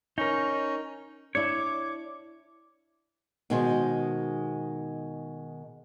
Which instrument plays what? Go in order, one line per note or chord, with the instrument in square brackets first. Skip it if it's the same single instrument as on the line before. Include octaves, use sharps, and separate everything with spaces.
[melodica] C#4 [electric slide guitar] D#4 A#4
[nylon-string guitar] D4 E4 [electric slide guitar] C#5 [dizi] D6
[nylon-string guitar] B2 D#3 G#3 G#4 C5